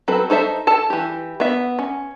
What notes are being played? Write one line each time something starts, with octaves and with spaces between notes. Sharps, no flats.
F#3 C4 A4 B4
D#4 A4 C5 E5
A4 A5
E3 G4
B3 E5
C#4